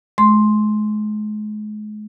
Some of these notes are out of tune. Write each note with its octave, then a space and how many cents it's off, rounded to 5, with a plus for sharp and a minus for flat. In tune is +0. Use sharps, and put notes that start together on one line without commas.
G#3 +35 C6 +5